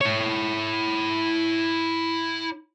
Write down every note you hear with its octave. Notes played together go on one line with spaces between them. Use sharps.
E4 C#5